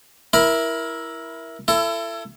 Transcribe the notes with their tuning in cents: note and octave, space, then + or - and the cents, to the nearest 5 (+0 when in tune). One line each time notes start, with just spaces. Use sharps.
E4 +0 A#4 +15 B5 -5
E4 +35 A4 +20